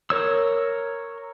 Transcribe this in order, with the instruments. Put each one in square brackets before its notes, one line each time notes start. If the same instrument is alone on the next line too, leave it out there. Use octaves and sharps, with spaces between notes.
[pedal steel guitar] A#4 C#5 E6